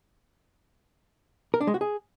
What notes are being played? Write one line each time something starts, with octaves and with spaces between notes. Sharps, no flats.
A#4
D4
G#3
F#4
G#4